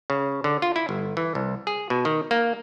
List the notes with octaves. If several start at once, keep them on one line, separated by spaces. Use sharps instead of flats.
C#3
D3
F4
E4
G1
E3
C2
G#4
B2
D#3
A#3